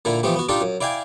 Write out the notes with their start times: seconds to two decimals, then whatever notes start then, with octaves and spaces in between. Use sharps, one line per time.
0.05 A#2 D3 E4
0.23 E3 F3 A3 B3 G4
0.36 B3 F#4
0.49 D4 D#4 F4 G4 A4
0.61 F#2
0.81 E4 D5 F5 G5 G#5